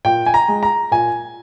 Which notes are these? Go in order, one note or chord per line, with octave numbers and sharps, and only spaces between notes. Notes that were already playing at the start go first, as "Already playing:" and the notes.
A#2 G5
G#5
A#5
G#3
A#5
A#2 G#5